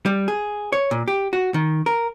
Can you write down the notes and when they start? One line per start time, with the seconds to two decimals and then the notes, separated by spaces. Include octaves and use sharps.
0.06 G3
0.28 G#4
0.72 C#5
0.91 A#2
1.08 G4
1.33 F#4
1.54 D#3
1.86 A#4